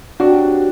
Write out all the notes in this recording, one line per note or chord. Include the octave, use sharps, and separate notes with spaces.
F#3 C4 D4 F#4 G4